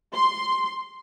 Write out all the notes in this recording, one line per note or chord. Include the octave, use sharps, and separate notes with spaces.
C6